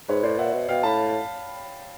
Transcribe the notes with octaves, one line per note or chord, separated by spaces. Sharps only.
G#2 B4 C#5
A2 C5 D5
A#2 E5 F#5
B2
B2 F5 G5
A2 A5 B5